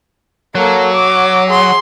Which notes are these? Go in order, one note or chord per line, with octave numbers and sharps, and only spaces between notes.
F#3 A#3 A4
D6
G#4 C6